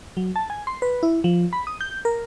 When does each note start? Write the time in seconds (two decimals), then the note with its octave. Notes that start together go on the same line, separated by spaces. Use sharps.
0.17 F#3
0.36 A5
0.50 G#5
0.67 C6
0.82 B4
1.03 E4
1.24 F3
1.53 B5
1.67 D#6
1.81 G6
2.05 A#4